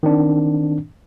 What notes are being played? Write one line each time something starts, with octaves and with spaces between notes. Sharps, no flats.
D#3 C4 D4